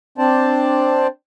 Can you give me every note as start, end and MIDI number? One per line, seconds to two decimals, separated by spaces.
0.18 1.07 60
0.18 1.07 62
0.18 1.07 72
0.18 1.07 74
0.18 1.07 81